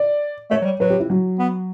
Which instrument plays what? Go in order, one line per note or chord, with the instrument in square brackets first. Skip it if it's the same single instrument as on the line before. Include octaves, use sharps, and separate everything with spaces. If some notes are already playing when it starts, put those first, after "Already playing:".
Already playing: [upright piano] D5
[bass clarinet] A3 [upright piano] C#5
[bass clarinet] F#3
G3
[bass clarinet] F#3 [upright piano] B4
[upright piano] G4
E4
F#3
[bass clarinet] B3